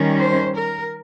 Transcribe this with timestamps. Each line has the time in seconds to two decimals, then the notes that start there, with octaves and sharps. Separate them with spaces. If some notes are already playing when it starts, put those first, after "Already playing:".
Already playing: D#3 G3 C#4
0.20 C5
0.57 A#4